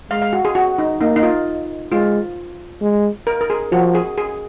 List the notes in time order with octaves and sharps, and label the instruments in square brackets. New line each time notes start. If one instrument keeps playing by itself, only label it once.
[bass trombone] G#3 [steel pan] F5
[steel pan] F5
F#4
G#4
F#4
D#4
[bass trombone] A#3 [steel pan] D#4
[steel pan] D#4
F4
[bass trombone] G#3 [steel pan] F4
[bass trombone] G#3
[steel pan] A#4
A#4
G#4
[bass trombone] F3 [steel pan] F#4
[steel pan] G#4
G#4